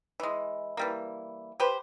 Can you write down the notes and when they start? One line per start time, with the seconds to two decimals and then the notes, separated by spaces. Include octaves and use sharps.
0.20 E3 G#3
0.77 E3 G3 A#3
1.60 G4 B4 C5